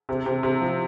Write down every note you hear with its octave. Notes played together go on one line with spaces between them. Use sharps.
C3
C3
C3
F3